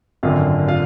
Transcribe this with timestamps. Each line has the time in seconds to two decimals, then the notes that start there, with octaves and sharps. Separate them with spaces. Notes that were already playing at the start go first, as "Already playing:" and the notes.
0.23 G#1 F#2 D3 F4 F5
0.68 F4 F5